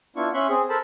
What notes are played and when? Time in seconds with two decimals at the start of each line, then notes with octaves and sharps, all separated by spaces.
0.16 B3 D4 E4 F4 C#6
0.34 C#4 E5 C6 C#6 F#6
0.49 C4 G#4
0.69 A4 A#4 C5 A5 B5